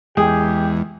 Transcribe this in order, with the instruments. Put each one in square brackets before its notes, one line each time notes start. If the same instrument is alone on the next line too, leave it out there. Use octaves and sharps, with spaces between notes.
[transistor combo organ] E2 [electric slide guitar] G#3 G5 [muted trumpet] G4 [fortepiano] G#4